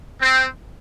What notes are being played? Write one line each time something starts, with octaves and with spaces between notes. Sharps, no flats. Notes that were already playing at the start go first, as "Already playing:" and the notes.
C4